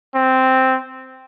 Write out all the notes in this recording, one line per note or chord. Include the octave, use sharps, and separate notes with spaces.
C4